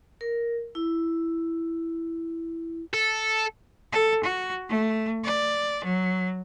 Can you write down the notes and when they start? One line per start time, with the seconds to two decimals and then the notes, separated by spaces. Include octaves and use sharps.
0.21 A#4
0.75 E4
2.94 A4
3.92 A4
4.24 F#4
4.69 A3
5.24 D5
5.85 F#3